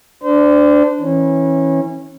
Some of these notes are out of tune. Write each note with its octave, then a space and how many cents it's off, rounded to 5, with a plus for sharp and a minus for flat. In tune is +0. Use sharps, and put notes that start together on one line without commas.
D4 +0 C5 -35
E3 -20 C#4 -25